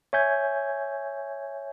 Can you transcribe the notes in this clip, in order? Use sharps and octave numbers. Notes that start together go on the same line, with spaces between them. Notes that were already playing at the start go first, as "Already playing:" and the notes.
C#5 E5 G#5 G6 G#6